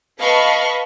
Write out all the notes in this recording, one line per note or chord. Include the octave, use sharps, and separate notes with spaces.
B4 D#5 F5 A5 B5 C#6